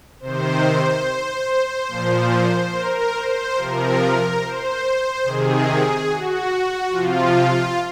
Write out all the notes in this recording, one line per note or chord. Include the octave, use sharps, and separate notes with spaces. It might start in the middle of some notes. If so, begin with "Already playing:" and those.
C3 D#3 C5
A#2 F3
A#4
C5
C3 F3 A#4
C5
C3 D#3 G#4
F#4
C3 F3 F4